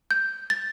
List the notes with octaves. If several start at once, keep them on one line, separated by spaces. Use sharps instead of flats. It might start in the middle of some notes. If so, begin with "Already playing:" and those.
G6
A6